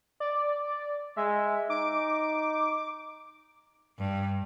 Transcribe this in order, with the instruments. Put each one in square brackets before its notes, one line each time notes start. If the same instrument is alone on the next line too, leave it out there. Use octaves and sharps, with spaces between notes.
[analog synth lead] D5
[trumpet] G#3 [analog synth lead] E5
[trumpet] D#4 [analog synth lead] D6
[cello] G2